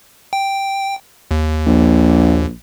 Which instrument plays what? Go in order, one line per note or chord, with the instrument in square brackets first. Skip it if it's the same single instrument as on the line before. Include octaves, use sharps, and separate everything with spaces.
[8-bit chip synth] G5
D#2
[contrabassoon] A#1